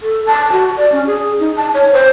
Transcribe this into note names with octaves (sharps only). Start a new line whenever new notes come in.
A4
A5
F#4
D5
C#4
G#4
D#4
A5
C#5
C5